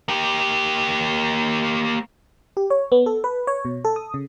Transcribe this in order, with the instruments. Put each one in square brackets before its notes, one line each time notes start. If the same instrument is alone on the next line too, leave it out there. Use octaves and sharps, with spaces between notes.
[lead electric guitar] A#3 G4
[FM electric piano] G4
C#5
B3
A4
B4
C#5
B2
A4
D#6
C#3